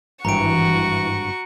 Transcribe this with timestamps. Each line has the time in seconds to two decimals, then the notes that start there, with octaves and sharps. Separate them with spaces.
0.25 G#1 G2 E3 F#4 G5 A#5 C#6 D7